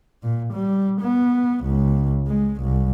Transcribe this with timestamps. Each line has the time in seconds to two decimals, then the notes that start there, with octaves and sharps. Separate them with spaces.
0.23 A#2
0.53 G3
1.01 B3
1.65 C#2
2.28 G#3
2.62 C2